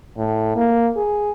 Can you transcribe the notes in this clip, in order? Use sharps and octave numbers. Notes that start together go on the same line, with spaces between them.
A2
A#3
G#4